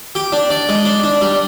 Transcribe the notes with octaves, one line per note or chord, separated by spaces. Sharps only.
G4
D4
D5
G#3
D4
D4
G3